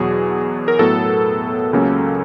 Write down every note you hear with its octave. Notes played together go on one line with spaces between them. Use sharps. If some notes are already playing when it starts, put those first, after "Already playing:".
Already playing: E2 B2 F#3 G#4
A#4
A2 F#3 B3 A4
C#2 C#3 F#3 A#3 C#4